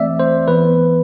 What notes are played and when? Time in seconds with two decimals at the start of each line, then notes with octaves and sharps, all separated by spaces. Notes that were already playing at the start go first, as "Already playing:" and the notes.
Already playing: E3 A3 C4 D5 E5
0.20 C5
0.48 E3 B3 B4